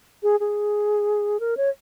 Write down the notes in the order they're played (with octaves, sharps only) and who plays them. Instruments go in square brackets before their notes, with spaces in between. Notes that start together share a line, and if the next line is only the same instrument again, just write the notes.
[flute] G#4
G#4
A#4
C#5